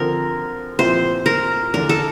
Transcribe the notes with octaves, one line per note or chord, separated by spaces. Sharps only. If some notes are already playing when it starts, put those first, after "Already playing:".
Already playing: D3 F3 C4 A#4
A#2 F3 C4 E4 C5
A#4
E2 D3 A3 D4 A#4
A4